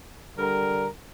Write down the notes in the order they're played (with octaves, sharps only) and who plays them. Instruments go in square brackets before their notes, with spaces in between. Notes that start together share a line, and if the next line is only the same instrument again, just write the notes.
[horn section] D3 G3 A#4